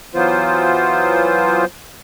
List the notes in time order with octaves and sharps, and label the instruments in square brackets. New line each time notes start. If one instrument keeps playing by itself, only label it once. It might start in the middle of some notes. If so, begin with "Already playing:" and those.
[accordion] E3 F#3 B3 F4 C5